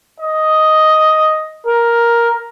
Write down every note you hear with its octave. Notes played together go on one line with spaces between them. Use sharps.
D#5
A#4